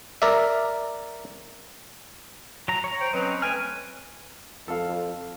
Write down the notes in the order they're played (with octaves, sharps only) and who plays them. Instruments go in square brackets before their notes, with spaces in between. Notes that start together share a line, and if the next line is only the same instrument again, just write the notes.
[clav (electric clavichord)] A#4 D5 E5
[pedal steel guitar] F#3 A#5
C#5 A#5
[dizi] C5 [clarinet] G5
[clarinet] F#3 [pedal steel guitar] C4 C#4 D#5 [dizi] B4
[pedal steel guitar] A3 G5 F6 [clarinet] G#5
[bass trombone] F2 [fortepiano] A4 F5